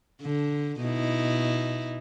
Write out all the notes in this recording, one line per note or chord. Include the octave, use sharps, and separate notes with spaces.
D3
B2 D#4 E4